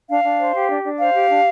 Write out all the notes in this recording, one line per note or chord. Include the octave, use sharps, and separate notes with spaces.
D4 F5
D4
C5
G4
D4
D4
C5 F5
G4
D4